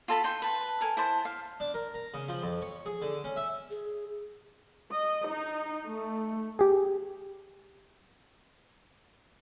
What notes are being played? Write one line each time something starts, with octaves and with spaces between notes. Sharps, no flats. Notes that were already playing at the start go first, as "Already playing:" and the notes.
F4 A4 A5 B5
D#4 G5 C6
B4 A5
A4 A#4 G#5
E4 C5 A5
F5
D4
A#4
A#5
C#3
F3
F2
C#5
G#4
D3
C#4
E5
G#4
D#5
D#4
A3
G4 G#4